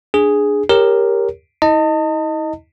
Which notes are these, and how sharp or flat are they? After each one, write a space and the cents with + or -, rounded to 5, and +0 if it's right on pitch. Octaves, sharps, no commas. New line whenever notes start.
D4 +0 G#4 +0
G4 +20 A#4 +0 C#5 +0
E4 -45 D#5 +0 A5 +40